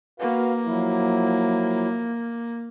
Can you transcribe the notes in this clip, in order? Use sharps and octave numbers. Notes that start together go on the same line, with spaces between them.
A#3 F#4 B4 F5
F3 F#3 E4